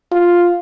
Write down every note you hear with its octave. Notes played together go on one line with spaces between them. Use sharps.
F4